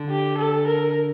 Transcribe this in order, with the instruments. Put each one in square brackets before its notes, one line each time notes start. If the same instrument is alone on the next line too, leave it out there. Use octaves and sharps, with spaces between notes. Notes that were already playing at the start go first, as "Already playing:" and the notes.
Already playing: [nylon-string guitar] D3
[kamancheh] G4
A4
A#4